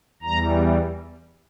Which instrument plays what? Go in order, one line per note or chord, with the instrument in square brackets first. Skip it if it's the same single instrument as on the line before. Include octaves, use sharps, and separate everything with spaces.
[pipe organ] E2 E3 G3 A#5